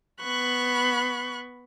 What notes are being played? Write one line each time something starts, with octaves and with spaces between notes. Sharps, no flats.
B3 B5 C#6 F#6